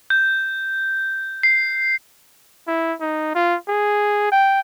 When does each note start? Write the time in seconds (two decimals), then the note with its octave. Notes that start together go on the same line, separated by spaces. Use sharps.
0.10 G6
1.43 C7
2.68 E4
3.01 D#4
3.35 F4
3.68 G#4
4.32 G5